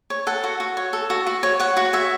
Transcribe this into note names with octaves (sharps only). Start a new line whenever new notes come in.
C#5
A4 F#5
F#4
F#4
C#5
A4
F#4
F#4
C#5
C#5 F#5
F#4
C#5 E5